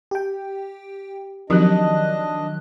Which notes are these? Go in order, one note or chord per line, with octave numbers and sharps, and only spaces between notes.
G4 G5
D#3 F3 F#3 C4 D4 G4 D#5 F#6